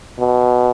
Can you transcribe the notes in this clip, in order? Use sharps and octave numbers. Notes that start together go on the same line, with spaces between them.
B2